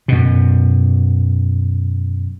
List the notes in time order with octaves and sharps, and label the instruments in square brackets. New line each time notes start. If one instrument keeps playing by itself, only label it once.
[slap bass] F#2 B2